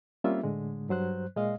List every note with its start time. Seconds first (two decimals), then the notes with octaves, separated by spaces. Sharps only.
0.24 G3 A#3 C4 C#4 F4 E5
0.43 A2 D3 G#3
0.89 G2 F#3 C5 F#6
1.36 A#2 G#3 D#5 F5